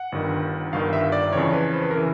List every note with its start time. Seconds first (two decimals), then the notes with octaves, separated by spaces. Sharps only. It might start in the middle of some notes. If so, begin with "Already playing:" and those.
Already playing: F#5
0.12 G1 G2 D#3
0.73 G1 G2 D#3 F5
0.93 E5
1.12 D5
1.33 F2 C#3 E3 C#5
1.53 B4
1.73 C5
1.82 B4
1.91 A#4
1.95 C#3 E3